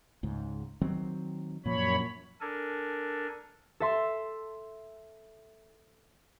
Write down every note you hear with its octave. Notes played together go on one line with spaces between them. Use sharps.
C#2 G#2
D#3 F#3 C4
F#2 A#2 F3 C#5 B5
D4 A4 A#4 G#5
A4 E5 C6